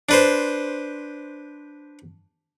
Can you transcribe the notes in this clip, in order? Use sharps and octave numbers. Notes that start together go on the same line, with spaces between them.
D4 B4 C5